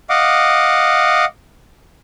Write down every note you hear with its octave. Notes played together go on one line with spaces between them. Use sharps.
D#5 F5 F#5 D6